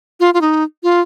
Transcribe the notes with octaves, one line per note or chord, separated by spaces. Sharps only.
F4
F4
D#4
F4